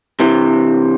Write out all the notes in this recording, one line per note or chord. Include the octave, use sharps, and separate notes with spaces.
C3 E3